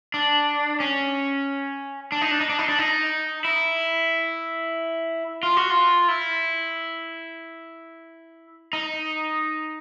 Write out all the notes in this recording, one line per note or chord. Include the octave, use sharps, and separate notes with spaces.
D4
C#4
D4
D#4
D4
D#4
D4
D#4
D4
D#4
E4
F4
F#4
F4
E4
D#4